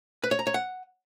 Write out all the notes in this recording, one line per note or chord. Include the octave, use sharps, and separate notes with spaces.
B4
C#5
A#5
C#5
F#5